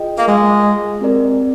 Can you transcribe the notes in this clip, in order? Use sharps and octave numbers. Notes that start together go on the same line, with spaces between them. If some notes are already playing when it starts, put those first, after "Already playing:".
Already playing: F4 G#4 D#5 G5
A#3
G#3
C4 G4 A#4 D5